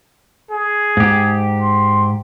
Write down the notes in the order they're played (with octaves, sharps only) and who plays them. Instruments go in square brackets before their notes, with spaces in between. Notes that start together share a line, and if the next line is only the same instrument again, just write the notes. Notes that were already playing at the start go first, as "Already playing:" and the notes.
[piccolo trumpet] G#4
[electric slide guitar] G#2 G4
[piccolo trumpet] C6